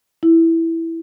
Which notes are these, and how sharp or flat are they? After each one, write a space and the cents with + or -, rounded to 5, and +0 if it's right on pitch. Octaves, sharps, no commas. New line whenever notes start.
E4 +0